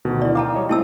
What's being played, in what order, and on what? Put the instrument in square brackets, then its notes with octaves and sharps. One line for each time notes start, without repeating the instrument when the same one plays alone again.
[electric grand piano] D2 B2 D#3
[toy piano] E4 D5
[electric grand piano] F5 G5 [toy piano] A5 A#5 D6
[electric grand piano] G3 C#5 D#5
[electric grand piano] A3 C4 [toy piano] E4 A5 E6